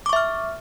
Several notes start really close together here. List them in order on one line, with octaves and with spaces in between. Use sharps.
D6 C#6 E5 F6